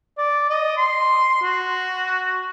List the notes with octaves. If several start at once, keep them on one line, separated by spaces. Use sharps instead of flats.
D5
D#5
C6
F#4